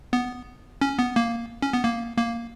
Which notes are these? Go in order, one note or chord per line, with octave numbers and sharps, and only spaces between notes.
B3
C#4
B3
A#3
C#4
B3
A#3
A#3